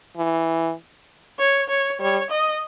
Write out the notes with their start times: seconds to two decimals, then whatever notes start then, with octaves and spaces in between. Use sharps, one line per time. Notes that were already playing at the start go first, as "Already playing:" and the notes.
0.17 E3
1.39 C#5
1.69 C#5
2.00 G3 C#5
2.30 D#5